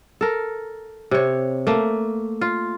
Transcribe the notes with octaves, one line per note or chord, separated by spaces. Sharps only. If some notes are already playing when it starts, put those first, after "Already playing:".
A4 A#4
C3 C#5
A3 A#3
F4